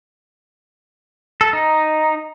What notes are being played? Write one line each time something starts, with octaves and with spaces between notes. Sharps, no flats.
A4
D#4